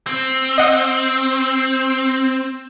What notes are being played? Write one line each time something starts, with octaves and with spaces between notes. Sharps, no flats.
C4
D#5 F#5 D#6